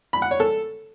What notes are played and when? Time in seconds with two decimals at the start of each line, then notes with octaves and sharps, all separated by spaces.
0.13 B5
0.22 F#5
0.31 C#5
0.40 A4